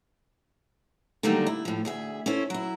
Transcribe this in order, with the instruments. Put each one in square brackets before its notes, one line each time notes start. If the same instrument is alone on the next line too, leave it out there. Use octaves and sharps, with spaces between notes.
[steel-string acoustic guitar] D3 D#3 F#3 G3 A3 A#3
E4
A2 F3
D2 G#4 E5
C#4 E4 A4 C5
F#3 E4